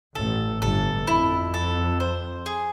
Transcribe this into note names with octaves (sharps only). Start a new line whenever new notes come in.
A1 A2 A4
G1 G2 A4
F2 E4
A4
C5
G#4